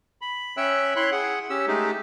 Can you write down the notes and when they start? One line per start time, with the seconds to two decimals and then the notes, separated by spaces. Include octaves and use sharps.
0.21 B5
0.57 C#4 C#5 E5 G5 E6 F#6
0.96 E4 C#5 B5 C6 F#6
1.12 G#4 F#5
1.50 C#4 G4 E6
1.67 G#3 A3 D#4 G4 G#4